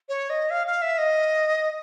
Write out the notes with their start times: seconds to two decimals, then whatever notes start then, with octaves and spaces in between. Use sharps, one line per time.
0.09 C#5
0.30 D#5
0.50 F5
0.67 F5
0.82 E5
0.98 D#5